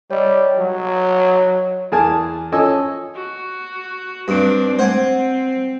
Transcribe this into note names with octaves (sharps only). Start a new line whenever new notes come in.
G3 C#5 D#5
F#3
E2 G#4 A#4 G#5 A5
F3 C#4 A4 D#5 G#5 E6
F#4
G2 C4 D4
C4 C5 F#5 G#5